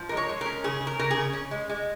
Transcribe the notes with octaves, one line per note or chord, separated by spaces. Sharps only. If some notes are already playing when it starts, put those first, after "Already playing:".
Already playing: F3
G#3 A#4
C#5
G#3
C#4 A#4
C#3 G#4
C#3
A#4
C#3 A#4
G#4
C#3
C#4
G#3
G#3